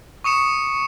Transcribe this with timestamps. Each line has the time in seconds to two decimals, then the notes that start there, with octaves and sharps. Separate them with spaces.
0.24 C#6 D#6 C#7 E7